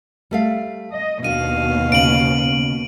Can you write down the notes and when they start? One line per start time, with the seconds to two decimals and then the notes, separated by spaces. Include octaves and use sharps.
0.31 G3 A3 F5
0.92 D#5
1.24 D#2 B2 D4 F#4 F5 D#7
1.92 C#3 D7 F#7